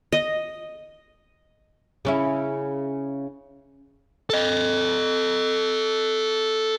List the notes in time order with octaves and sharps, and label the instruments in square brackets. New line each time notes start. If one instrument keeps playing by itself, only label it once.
[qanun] D#5
[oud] C#3 C#4 E4
[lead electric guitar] A4 D#5